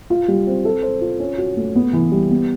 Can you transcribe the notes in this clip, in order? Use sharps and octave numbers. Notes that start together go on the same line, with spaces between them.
F4
G3
C4
A4
C5
F4
C#4
F#4
A3
B3
E3
G3
B3